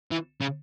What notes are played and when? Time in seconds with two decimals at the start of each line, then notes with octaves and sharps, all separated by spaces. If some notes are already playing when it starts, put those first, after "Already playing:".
0.12 E3
0.41 C#3